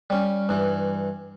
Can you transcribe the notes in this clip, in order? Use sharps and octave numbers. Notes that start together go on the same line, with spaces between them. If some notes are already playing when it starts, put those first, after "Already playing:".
G3 C#4
G2 E3